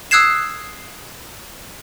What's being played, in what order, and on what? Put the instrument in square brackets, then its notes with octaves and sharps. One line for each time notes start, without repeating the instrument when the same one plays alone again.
[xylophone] D#6 E6 F#6 G#6 C7 E7